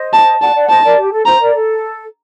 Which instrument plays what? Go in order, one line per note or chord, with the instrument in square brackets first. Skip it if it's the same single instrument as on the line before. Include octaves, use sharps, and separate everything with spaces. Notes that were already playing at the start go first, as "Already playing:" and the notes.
Already playing: [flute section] C5 D#5
[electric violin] A5
[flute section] D5 F#5 [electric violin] A5
[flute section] D5 F#5
[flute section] C5 D#5 [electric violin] A5
[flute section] A#4 D5
G4
A4
[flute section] C5 [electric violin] A#5
[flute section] A#4 D5
A4